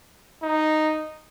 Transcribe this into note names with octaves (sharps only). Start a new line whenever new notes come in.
D#4